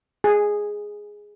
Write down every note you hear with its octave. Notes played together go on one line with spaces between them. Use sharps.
G#4